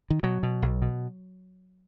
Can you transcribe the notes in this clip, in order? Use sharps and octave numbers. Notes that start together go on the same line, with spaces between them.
D#3
B2 F#3
B2
B1
B2